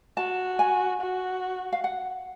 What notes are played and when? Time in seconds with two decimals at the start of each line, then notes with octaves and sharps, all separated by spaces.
0.17 F#4 A5
0.59 G#5
1.01 F#4
1.72 F5
1.84 F#5